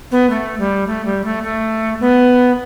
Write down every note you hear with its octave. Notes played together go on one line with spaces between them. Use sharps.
B3
A3
G3
A3
G3
A3
A3
B3